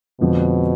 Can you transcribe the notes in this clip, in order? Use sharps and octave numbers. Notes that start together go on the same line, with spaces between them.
F2 B2 D3 F3 G#3 C4